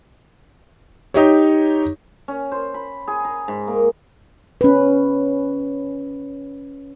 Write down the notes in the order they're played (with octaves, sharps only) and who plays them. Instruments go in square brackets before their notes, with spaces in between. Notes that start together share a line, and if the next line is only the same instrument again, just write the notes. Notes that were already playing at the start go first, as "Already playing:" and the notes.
[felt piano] D#4 G4 C#5
[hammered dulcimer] C#4
C5
B5
G#4
A#5
G#2
A#3
[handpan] C#4 B4